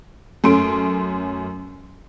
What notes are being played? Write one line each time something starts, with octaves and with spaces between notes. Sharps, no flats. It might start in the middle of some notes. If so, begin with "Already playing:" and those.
F#2 A3 C#4 C6 D7